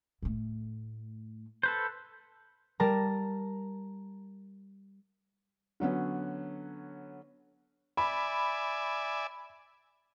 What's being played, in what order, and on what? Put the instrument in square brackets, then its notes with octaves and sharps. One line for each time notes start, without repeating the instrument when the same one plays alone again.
[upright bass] A2 A3
[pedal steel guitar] A4 B4 C5
[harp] G3 A#4 A5 A#5
[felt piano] D3 F#3 B3 C#4
[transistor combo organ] D5 E5 G#5 [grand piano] B5